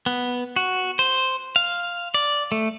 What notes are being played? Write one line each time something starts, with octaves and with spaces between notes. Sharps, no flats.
B3
F#4
C5
F5
D5
A3